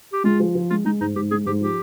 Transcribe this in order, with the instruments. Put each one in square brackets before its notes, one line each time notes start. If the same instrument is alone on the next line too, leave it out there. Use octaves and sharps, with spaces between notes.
[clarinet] G4
[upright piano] G#3 [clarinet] F4
[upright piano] F3
F3
[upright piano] G#3 [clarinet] F4
[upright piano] G#3 [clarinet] D#4
[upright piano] G#2 [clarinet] D#4
[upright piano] G#2 [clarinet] G4
[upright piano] G#3 [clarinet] G#4
[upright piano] G#2 [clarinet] G4
[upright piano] F3 [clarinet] G4